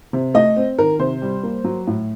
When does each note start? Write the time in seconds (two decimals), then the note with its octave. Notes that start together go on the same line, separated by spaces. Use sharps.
0.13 C3
0.34 A3 D#5
0.56 C4
0.78 D#3 A#4
0.99 C3 C5
1.22 G3
1.43 A#3
1.64 F#3
1.87 A2